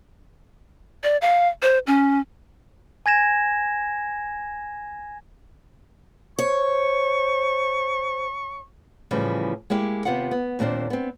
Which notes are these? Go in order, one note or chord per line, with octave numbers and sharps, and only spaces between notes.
D5
F5
C5
C#4
G#5 G#6 A#6 E7
C5 C#5 C#6
A2 C#3 E3 F3 G3
G#3 A#3 E4 G4
D#2 C3 B3 F4 F#5
B3
D#2 A#2 C4 D4 C5
B3 C4